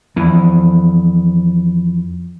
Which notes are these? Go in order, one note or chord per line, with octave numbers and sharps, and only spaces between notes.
F2 E3